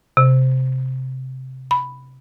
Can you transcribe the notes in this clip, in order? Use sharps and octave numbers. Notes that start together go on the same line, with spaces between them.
C3
B5